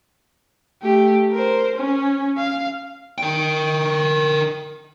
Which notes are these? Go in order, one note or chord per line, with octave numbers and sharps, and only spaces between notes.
A3 G4
A#4 C5
C#4
F5
A#4 G5